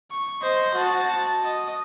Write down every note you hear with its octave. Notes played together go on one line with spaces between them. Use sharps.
C#6
C5 D#5
F#4 A5
D#5